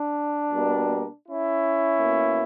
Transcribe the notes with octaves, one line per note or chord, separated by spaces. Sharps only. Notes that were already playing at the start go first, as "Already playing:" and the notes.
Already playing: D4
B2 G3 A#3
C#4 E4
B2 A#3